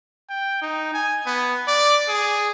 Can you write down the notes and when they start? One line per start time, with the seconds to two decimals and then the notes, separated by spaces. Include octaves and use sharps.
0.29 G5
0.62 D#4
0.94 G#5
1.26 B3
1.68 D5
2.08 G#4